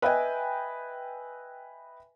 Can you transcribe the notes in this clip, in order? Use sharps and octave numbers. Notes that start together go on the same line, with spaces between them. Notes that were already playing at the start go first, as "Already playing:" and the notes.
B4 D#5 E5 G5 G#5